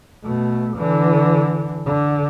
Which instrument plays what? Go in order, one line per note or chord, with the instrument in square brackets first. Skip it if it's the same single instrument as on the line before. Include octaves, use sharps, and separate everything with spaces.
[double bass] B2 A3
D3 E3
D3